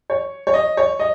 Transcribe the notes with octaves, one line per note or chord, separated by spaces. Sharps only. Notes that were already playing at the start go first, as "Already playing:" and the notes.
C#5
C#5
D#5
C#5
D#5